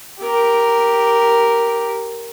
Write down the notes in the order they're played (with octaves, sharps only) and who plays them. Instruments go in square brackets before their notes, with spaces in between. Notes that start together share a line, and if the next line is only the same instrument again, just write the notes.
[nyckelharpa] G4 A#4